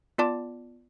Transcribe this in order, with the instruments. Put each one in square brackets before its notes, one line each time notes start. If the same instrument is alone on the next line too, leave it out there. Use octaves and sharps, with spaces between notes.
[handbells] B3 F4 D5 A5 D6